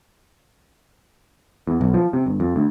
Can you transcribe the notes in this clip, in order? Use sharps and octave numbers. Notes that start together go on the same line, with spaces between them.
E2
B1
F3
C3
G1
F2
D2